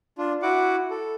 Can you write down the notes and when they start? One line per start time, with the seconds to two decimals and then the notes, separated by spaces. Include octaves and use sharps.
0.18 D4 F4
0.42 E4 F#4 F#5 D6
0.91 A4